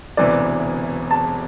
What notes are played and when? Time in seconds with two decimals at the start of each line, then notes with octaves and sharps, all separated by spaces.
0.17 E1 D2 C3 E3 B3 D5
1.11 A5